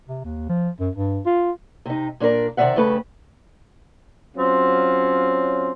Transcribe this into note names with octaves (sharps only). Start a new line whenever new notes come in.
C3
D#2
F3
F#2
G2
F4
C3 D#4
A#2 D4 E4 A#4 D5
C3 D#3 F#3 D5 E5 F#5
G2 C#3 A3 B4 A5
F#3 C4 C#4 F4